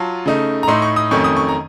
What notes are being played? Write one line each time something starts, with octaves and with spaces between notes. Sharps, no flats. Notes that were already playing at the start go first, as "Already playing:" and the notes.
Already playing: F#3 F4 A5
C#3 A3 D#4
A#5
A2 A3 D#4 C6
C#6
D#6
F2 D#3 F#3 A3 C#4 C#6
D#6
C#6
A#5